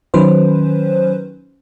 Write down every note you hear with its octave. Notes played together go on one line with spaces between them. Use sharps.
D#3 F#3 C#4 B4 C5